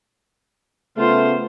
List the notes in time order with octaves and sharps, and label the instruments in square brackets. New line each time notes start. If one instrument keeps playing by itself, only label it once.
[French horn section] C#3 A3 B3 [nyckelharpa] F4 C5